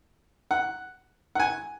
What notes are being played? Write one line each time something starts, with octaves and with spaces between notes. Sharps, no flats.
F#5
F#5
G#5